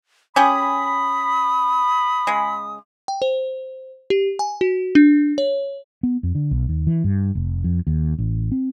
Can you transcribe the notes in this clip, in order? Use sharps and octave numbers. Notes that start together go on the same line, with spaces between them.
C#4 G4 G#4 B5 D#6
C#3 G#3
G5
C5
G4
G#5
F#4
D4
C#5
B3
F2
D3
B1
D#2
E3
G2
F1
F2
D#2
A1
C4